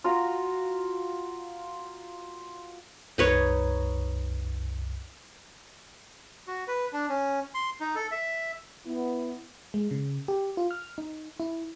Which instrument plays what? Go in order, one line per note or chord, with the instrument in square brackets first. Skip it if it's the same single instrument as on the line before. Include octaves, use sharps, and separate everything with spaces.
[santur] F4 F#4 A#5
[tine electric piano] C2 F#2 [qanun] D#4 B4 C#5
[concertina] F#4
B4
D4
C#4
C6
D#4
A4
E5
[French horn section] B3 E4
[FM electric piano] G#3
C#3
G4
F4
F6
D#4
E4